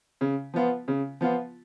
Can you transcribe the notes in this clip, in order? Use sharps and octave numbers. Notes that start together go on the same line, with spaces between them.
C#3
F3 B3 F4
C#3
F3 B3 F4